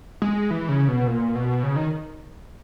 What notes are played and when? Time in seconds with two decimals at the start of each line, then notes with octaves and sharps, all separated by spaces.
0.22 G#3
0.51 E3
0.69 C#3
0.88 B2
1.07 A#2
1.35 B2
1.63 C#3
1.76 D#3